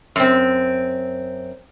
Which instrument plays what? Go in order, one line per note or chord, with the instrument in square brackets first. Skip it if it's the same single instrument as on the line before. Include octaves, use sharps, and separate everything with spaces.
[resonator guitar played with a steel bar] F#2 C4